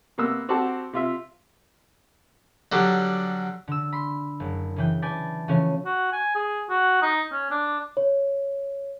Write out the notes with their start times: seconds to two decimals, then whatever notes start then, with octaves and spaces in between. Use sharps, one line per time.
0.18 C3 A#3 B3 E6
0.49 C4 F#4 G4 A4 F#5 A5
0.93 C3 F4 E5
2.72 D3 F#3 G3
3.68 D3 E6
3.92 B5 C6
4.40 F#1
4.76 C#3 E3 G5
5.02 B4 D5 G#5 A5 G6
5.48 C#3 E3 F3 A3 C#4
5.85 F#4
6.12 G#5
6.35 G#4
6.69 F#4
7.02 D#4
7.32 C#4
7.51 D4
7.97 C#5